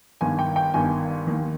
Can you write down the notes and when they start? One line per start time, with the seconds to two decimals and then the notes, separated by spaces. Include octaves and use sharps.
0.21 G1 G2 D#3 G#5
0.39 G5
0.56 G5
0.74 G1 G2 D#3 G#5
1.27 D#2 D#3